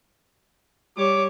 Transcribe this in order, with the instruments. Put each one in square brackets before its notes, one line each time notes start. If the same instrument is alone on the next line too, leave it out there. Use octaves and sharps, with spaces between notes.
[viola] G3 C#5 [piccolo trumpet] D6